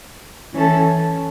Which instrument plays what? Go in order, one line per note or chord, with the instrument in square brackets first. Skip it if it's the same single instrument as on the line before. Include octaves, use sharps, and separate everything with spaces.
[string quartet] E3 C#4 A4